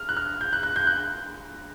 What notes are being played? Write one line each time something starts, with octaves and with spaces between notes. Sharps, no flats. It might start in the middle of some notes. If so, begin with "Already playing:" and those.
Already playing: F6
F#6
F6
G6
F#6
F#6
G6
F#6